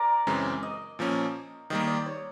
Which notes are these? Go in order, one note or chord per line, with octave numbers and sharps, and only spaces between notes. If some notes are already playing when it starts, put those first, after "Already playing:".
Already playing: A#4 D5
F#2 C#3 E3 G#3 C4
D#5
A#2 F3 A#3 C#4
D#3 G3 A#3 D#5
D5
C#5